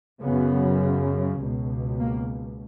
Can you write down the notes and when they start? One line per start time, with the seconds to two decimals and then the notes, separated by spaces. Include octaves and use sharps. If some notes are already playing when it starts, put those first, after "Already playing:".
0.23 F#2 C#3 B3
1.41 C#2 B2
2.00 A#3